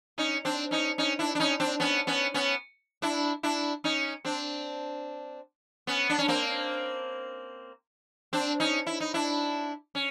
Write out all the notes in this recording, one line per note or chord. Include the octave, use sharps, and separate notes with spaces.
C#4 D#4
C4 D4
C#4 D#4
C#4 D#4
D4 E4
D4
C#4 D#4
C4 D4
B3 C#4
B3 C#4
B3 C#4
D4 E4
D4 E4
C#4 D#4
C4 D4
B3 C#4
D4
C#4
A#3 C4
C4 D4
C#4 D#4
E4
D#4
D4 E4
C#4